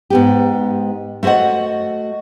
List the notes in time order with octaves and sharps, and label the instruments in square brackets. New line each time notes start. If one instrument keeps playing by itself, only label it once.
[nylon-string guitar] G#2 B3 G4
A3 F#4 C5 D#5 F#5